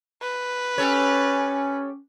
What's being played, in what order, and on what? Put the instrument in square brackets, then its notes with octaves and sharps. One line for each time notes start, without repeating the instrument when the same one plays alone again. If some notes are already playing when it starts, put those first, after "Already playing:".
[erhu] B4
[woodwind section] C#4 [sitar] G4 A4 C#5